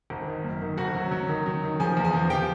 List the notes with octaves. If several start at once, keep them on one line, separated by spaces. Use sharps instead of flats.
G#1
D#3
F#2
D#3
G#1 F#4 F#5
F#3
F#3
D#3
F#3
D#3
F3 G#4 G#5
E2
G#4 G#5
F3
F3 G4 G5